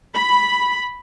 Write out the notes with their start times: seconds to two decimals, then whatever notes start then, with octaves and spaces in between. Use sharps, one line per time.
0.14 B5